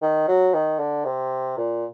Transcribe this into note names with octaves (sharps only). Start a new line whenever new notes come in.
D#3
F#3
D#3
D3
C3
A#2